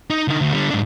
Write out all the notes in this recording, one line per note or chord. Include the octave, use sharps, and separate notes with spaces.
D#4
D3 D#4
D2
D3 G3
G#2 D4